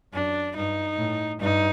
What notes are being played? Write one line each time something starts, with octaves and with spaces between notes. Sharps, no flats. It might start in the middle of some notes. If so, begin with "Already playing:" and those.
F#2 D4
G2 D#4
A2
G2 D#4